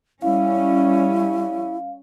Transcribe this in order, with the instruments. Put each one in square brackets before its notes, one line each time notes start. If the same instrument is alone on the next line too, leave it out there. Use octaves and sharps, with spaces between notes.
[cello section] G3 C#4 [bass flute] E4 [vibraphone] F5